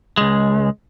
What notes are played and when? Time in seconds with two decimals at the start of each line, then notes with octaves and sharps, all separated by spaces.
0.17 C#2 G#3